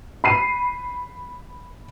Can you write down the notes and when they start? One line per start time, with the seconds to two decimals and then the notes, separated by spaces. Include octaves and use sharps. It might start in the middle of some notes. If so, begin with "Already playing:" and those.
0.24 B5 C7 D#7